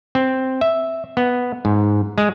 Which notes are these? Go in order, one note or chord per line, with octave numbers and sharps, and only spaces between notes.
C4
E5
B3
G#2
G#3